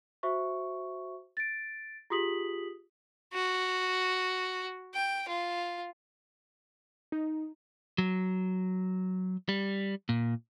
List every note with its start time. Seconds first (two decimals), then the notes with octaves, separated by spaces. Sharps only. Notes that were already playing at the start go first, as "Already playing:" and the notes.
0.23 F#4 C5 E5 C#6
1.37 A6 D7
2.10 F4 G4 G#4 D#6 B6 F#7
3.34 F#4
4.94 G5
5.28 F4
7.12 D#4
7.98 F#3
9.49 G3
10.09 A#2